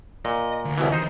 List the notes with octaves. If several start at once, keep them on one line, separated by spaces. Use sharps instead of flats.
A#2 D#5
D2
C2 B2 E3
D#3 E3 D#4 C5